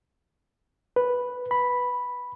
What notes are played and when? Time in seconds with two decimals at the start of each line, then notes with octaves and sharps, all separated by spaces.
0.96 B4
1.51 B5